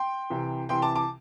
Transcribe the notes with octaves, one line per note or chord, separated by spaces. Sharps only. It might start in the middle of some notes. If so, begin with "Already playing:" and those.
Already playing: G5 C6
C2 C3 E3
C2 C3 E3 G5 C6
A5 D6
A5 D6